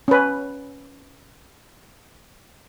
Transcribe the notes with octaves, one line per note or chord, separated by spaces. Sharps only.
C#4 B4